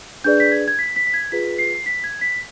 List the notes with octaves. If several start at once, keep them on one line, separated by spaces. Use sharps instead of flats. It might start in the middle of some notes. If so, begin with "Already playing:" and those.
D4 G#4 B4 D5 G6
B6
G#6
G#6
B6
B6
B6
G#6
F4 G#4 B4 B6
C7
B6
G#6
B6